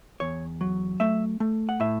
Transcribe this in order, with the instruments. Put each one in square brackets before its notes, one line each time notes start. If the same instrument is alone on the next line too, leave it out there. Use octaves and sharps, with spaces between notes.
[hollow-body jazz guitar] E2 C#5
F#3
A3 E5
A3
F#5
A2 E5